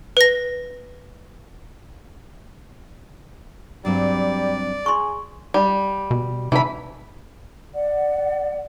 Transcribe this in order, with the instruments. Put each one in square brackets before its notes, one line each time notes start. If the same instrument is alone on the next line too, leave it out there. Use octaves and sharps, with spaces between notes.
[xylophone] B4 A#6
[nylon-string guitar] G2 F#3 C4 [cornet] G3 [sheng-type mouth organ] D5
[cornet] G#4 [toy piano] C6 C#6
[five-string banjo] G3
[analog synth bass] B2
[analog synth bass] C3 [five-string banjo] E3 B5
[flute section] D5 F#5